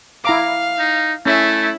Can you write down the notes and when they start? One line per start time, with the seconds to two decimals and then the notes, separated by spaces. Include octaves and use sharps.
0.25 E4 F5 A#5 D6
0.79 D#4
1.26 A3 C#4 E4